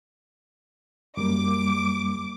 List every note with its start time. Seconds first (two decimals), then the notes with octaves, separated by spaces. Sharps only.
1.17 F#2 G3 A#3 D6